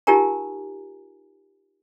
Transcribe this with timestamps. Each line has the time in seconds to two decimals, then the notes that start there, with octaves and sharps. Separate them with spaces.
0.07 D#4 F4 G4 A#4 G#5 A#5